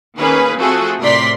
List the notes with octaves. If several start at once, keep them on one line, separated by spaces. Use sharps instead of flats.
D#3 A#3 C#4 G#4 B4
F3 A3 C4 F#4 G#4 A4
A2 C3 A#4 D5 C6 B6